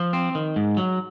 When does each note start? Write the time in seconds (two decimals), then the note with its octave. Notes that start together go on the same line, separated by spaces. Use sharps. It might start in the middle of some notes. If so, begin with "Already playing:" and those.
Already playing: F3
0.13 C4
0.35 D#3
0.56 G#2
0.77 F#3